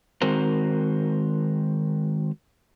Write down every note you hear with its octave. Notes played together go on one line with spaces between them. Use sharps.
D#3 G#3 C4 F#4 A#4 C5